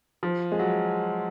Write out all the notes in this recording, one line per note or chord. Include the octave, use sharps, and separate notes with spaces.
F3
G#3
F#3